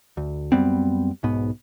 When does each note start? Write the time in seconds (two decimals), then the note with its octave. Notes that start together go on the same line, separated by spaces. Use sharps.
0.17 D2
0.52 F#2 G3 B3 C4
1.23 B1 G#2 B3